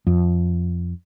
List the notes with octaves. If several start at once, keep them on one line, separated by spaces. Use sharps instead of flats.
F2